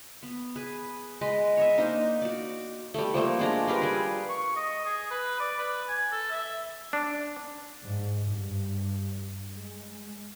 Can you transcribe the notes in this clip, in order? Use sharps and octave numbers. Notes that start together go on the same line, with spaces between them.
B3
G#4 B4
G#3 B4 D#5
C#5 D#5 E5
A#3 D4 D#4 C5
F#4 D5
G3 A3
F3 G3 A3 A#3
G#3 D4 A#5
G3 F4 A#4 B4
G3 G#4
C#6
D#5
G#4
B4
D5
B4
G#5
A4
E5
D4
G#2
G2
G#3